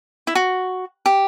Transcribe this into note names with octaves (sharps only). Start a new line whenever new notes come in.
E4
F#4
G4